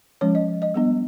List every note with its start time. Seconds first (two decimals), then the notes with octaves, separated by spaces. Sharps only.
0.21 F3 G#3 C#4 C#5
0.35 D#5
0.62 D#5
0.74 G3 B3 D4